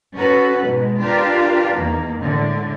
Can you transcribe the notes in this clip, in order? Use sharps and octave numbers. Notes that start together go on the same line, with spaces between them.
C#4 F#4 A4 B4
G#2 B2 G#3
D4 F4 G4 A#4 B4 F5
E2 D#3 A#3
A2 D3 G#3